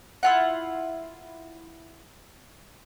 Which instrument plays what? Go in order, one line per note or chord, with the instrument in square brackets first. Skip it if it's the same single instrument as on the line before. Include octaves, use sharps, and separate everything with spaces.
[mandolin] E4 F4 F#5